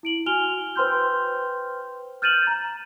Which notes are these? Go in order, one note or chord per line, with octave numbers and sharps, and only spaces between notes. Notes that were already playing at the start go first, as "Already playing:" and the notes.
E4 D7 F#7
F#4 G#5 F6 F7 G7
B4 C5 G5 C6 F6 G6
F6 G6 A6 D#7 E7 F#7
A#5